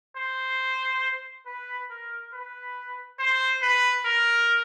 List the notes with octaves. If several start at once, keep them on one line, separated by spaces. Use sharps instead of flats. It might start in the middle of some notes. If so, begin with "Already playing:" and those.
C5
B4
A#4
B4
C5
B4
A#4